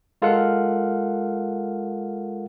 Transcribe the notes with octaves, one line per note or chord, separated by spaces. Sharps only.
G#3 F4 A4 A#4 F5 F#5